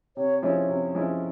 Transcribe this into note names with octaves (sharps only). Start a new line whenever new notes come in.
C3 C#5
F3 G#3 C#4 E4 C#5
C3
F3 G#3 C#4 E4